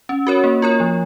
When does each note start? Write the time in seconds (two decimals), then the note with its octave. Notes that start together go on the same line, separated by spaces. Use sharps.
0.09 C#4
0.27 F#4 A#4 C#5
0.44 A#3
0.62 F4 A#4 C#5
0.80 F3